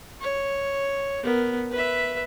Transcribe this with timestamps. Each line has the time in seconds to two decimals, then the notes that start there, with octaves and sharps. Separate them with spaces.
0.21 C#5
1.23 B3 A#4
1.71 B4 E5